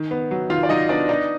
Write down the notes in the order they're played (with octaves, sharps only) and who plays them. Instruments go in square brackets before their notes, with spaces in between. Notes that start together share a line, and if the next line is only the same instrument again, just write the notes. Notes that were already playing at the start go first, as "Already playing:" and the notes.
Already playing: [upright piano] D#3
B3
F#3
[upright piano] D#3 [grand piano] F4 F5
[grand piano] D5
[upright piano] F#3 [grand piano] D#4 D#5
[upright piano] B3 [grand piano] D4 D5
[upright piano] D4 [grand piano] D#4 D#5